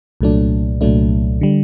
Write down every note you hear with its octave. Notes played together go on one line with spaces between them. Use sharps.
C2 A#2 F#3 A3 D4
C2 A#2 F#3 A3 D4
D3 G3